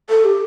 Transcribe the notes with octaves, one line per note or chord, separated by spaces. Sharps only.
A4
G4